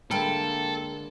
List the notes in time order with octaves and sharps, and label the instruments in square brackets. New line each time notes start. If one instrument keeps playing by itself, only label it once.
[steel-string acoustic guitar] D2 G#3 [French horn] A#3 [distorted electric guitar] A4 [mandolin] G5 B5 F6